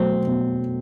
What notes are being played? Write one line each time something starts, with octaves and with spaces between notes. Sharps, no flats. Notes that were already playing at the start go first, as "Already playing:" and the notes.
Already playing: B2 F#3 A3 C4
B2